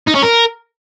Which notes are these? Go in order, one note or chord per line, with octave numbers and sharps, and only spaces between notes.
D#4
C#4
A#4